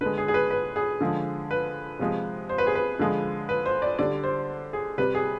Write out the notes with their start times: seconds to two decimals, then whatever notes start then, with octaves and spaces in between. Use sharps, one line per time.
0.01 D3 G#3 B4
0.18 G#4
0.28 G#4
0.34 B4
0.50 B4
0.76 G#4
1.01 D3 F3 G#3
1.51 B4
1.99 C3 F3 G#3
2.49 C5
2.58 B4
2.67 G#4
2.75 B4
2.99 D3 F3 G#3
3.49 B4
3.66 C5
3.82 D5
3.99 D3 G3 D5
4.24 C5
4.73 G#4
4.98 C3 G3 B4
5.15 G#4